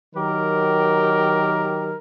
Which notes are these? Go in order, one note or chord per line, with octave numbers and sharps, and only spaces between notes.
D#3 F#3 G4 A#4